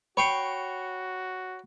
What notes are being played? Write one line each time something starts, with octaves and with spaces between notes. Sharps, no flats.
F#4 C#5 G5 B5 C7 C#7